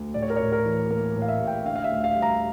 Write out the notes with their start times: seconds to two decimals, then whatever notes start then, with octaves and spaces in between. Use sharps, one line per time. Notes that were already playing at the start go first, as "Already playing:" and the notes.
Already playing: D2
0.14 A2 D5
0.22 C#5
0.30 A#4
0.36 A1 C#5
0.52 A#4
0.64 E3
0.90 A#3 A#4
1.16 A2
1.22 F5
1.28 E5
1.41 A1
1.47 G5
1.65 D3 F5
1.76 F5
1.84 E5
1.92 D2
2.04 F5
2.16 G3
2.22 A#5